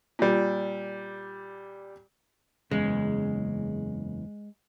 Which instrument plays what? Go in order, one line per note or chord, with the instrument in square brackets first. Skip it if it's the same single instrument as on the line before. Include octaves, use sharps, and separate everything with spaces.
[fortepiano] A#2 G3
[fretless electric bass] F#1 E2 C#3 [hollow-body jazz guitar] G#3